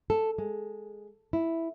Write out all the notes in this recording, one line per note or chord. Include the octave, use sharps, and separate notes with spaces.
A4
G#3
E4